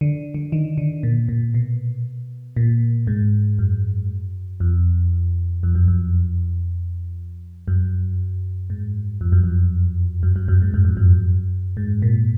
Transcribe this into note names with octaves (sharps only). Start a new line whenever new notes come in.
D3
D3
D#3
D3
A#2
A#2
B2
A#2
G#2
F#2
F2
F2
F#2
F2
F#2
G#2
F2
F#2
F2
F#2
F#2
F#2
G#2
F#2
F2
F#2
G#2
A#2